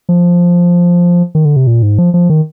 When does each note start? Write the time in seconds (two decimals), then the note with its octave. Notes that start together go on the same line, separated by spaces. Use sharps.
0.09 F3
1.35 D#3
1.45 D3
1.56 C3
1.67 A#2
1.82 G#2
1.99 F3
2.14 F3
2.30 D#3